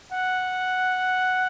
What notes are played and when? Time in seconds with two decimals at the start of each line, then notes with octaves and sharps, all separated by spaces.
0.12 F#5